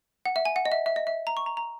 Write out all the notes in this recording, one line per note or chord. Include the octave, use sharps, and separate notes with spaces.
F#5
E5
G#5
F#5
D#5
E5
E5
D#5
E5
A#5
C#6
A#5
A#5